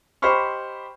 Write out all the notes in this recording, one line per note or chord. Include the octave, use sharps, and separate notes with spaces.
G4 C5 D#5 B5 C#6 F6